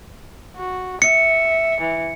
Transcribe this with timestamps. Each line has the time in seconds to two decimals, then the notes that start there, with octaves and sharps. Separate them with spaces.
0.56 F#4
1.02 E5 C#7
1.81 E3